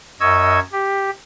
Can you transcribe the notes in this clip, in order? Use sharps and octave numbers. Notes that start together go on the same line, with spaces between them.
F#2 D#5 C#6 E6 G#6
G4